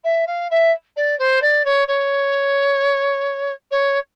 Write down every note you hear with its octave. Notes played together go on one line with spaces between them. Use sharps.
E5
F5
E5
D5
C5
D5
C#5
C#5
C#5